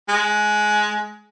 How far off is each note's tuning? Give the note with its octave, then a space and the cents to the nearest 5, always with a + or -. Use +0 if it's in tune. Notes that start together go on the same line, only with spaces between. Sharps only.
G#3 +15